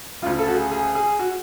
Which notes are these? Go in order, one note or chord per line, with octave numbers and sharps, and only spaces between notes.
D2 C#3 F4
A4
F#4
G#4
G#4
G#4
F#4